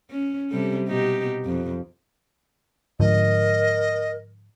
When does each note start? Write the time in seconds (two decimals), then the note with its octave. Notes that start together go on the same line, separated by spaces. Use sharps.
0.10 C#4
0.50 C3 G3 A4
0.88 B2 D#4 G4
1.45 F2
3.00 G#2 D3 F3 A#4 D#5